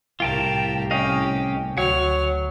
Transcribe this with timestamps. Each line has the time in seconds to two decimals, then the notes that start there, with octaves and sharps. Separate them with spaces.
0.20 C2 A2 F4 G4 A#4 G5 A5
0.91 C#4 G4 D#5 F5
1.77 D2 F#3 C#5 F#5 F6